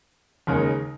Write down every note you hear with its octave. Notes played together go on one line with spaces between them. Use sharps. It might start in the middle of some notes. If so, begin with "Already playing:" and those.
D#2 C#3 G#3 D#4 A#4